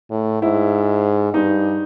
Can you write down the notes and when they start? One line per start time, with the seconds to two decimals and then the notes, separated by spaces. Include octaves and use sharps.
0.11 A2
0.42 G#2 E4
1.33 G2 D#4